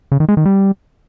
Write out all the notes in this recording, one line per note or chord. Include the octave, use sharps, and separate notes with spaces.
C#3
D#3
G#3
D#3
G3